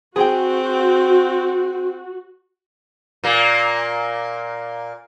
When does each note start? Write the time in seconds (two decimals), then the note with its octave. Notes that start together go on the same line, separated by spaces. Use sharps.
0.16 C4 F#4 G#4 G5
3.24 A#2 A#3